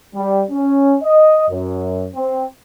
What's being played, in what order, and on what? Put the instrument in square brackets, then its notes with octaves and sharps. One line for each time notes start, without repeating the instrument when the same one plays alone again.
[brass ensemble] G3
C#4
D#5
F#2
C4